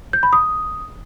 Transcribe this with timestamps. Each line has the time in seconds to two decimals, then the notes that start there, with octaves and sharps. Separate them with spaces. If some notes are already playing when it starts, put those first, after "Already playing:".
0.13 G6
0.23 B5
0.33 D#6